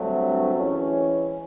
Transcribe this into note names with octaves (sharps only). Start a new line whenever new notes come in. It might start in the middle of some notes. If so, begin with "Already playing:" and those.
Already playing: G2 D3 F#3 A3 C4
E3 G#3 C#4